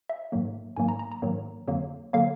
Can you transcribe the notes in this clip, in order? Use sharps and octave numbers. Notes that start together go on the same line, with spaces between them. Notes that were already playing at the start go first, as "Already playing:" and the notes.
E5
G#2 D#3 F#3 A#3
G#2 D#3 F#3 A#3 G#5
A#5
A#5
A#5
G#2 D#3 F#3 A#3
F2 D3 F#3 A#3
D3 F#3 A#3 F5